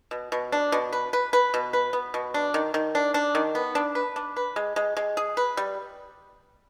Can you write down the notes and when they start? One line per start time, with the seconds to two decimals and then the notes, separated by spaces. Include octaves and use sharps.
0.11 B2
0.32 B2
0.52 D4
0.72 B2
0.93 B4
1.13 B4
1.33 B4
1.54 B2
1.73 B4
1.93 B3
2.14 B2
2.34 D4
2.54 D#3
2.74 D#3
2.95 D4
3.14 D4
3.35 D#3
3.55 B3
3.75 D4
3.95 B4
4.16 D4
4.36 B4
4.56 G#3
4.76 G#3
4.97 G#3
5.17 G#4
5.37 B4
5.57 G3